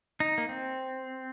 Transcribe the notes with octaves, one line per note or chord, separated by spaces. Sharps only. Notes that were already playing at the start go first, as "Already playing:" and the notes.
D#4
A#3
C4